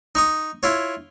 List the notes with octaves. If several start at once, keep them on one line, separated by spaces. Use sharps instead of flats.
D#4 C#6 D#6
E4 F4 C#5